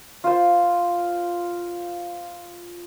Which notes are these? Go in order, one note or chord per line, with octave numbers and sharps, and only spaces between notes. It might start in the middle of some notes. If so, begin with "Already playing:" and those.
F4 C5